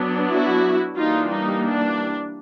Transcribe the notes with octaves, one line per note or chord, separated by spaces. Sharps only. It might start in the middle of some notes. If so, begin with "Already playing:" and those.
Already playing: F#3 B3 D4
E4 F#4
E3 G3 A#3 D4 D#4 F4
D#4
D4